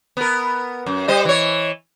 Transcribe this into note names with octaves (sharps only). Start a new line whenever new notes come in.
B3 A#4
F#2
G3 C5 D#5
E3 C#5